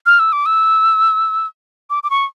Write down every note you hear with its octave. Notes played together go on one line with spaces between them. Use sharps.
F6
E6
D6
E6
D6
D6
C#6